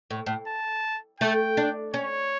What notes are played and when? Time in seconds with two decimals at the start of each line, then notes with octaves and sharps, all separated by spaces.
0.10 A2
0.26 A2
0.48 A5
1.20 A3 G5
1.57 D4
1.94 C#4 C#5